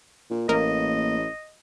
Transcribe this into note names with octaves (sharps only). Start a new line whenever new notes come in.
A#2
A1 A#3 D#5